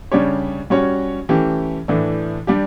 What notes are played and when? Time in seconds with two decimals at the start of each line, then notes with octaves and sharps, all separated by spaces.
0.12 C#3 G3 D4 G4 C#5
0.70 G3 C#4 F#4 C#5
1.29 E3 A3 C#4 G4
1.88 A2 E3 A3 D4
2.47 G3 D4 G4